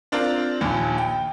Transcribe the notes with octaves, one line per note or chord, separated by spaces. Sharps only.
C4 D4 F4 A#4 D5
A#1 D#2 A#2
G5